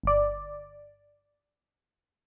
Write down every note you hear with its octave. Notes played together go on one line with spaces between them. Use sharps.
G1 D5